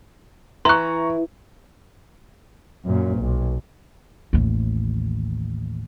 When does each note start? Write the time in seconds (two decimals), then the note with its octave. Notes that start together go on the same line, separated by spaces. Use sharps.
0.65 E3 A#5 C6 C#6 F#6
2.85 F#2 A#2
3.18 B1
4.33 A1 D#2